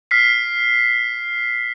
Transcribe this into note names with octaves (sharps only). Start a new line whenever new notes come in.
F6 B6 C7